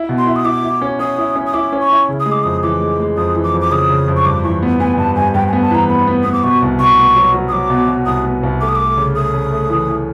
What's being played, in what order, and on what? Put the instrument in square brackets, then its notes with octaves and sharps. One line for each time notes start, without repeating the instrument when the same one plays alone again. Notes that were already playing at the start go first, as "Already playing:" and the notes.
Already playing: [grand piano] E4
B2
[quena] C6
[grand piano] E4
[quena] D#6
[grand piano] E4 [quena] D6
[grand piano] E4
C#4
[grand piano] C#4 [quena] D#6
[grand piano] E4
C#4
[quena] D#6
[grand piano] E4 [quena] D6
[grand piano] C#4
[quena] C#6
[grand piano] E4
C#3
[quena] D#6
[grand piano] G#3
[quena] D6
[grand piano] F2 [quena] D#6
[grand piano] E3 [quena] D6
[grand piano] G#3
G#3
[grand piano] F2 [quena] D#6
[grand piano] E3
[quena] D6
[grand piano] F2
[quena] D6
[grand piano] C#3 [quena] D#6
[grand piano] C#3
F2
[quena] C#6
[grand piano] G2 [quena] D6
[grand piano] E3 [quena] C#6
[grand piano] B3
[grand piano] B3 [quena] G#5
[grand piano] G2 [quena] A5
[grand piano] G2 [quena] G#5
[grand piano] G2 [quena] G5
[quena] G#5
[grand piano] B3
[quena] A5
[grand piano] E3 [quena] A#5
[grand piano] B3 [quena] B5
[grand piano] B3
[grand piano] B3 [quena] D#6
[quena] D6
[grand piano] B2 [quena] C#6
[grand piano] C2
[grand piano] B2 [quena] C#6
[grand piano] B3
F#3
F#3
[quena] D#6
[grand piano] F#3 [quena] D6
[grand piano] B2
B2
[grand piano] C2 [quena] D#6
[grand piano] B3
C2
[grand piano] A3 [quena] D6
[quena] D#6
[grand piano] A3 [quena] D6
[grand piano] C#3
[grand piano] A3 [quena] D#6
[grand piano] C#3
A3
E3
E3